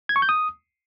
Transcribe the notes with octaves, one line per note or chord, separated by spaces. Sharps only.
G#6
C#6
G6
D#6